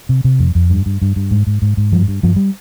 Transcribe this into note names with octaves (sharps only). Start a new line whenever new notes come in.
C3
C3
F2
F2
G2
G2
G2
G2
G#2
G#2
G#2
G#2
G2 F3
G2
G2 F3
G3